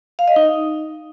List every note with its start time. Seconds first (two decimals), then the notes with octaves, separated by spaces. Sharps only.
0.19 F5
0.28 D#5
0.36 D#4